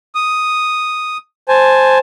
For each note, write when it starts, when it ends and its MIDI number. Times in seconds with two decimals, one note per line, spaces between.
0.15 1.17 87
1.48 1.98 72
1.48 1.98 80
1.48 1.98 81